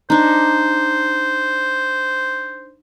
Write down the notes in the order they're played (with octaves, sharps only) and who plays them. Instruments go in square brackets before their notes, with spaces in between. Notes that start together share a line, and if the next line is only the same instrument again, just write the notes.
[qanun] D4 D#4 [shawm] C5